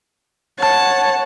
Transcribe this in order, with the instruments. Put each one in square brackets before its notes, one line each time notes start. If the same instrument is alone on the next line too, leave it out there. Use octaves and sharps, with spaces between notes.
[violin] C#5 F#5 [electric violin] A5